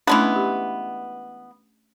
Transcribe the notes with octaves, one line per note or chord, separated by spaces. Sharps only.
E3 G#3 A3 B3 C#4 D4
G4